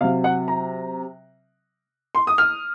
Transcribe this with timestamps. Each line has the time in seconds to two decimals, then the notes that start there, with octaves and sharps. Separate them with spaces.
0.01 C3 F5
0.04 F#3
0.24 F#5
0.48 A#5
2.15 C6
2.27 D#6
2.38 F6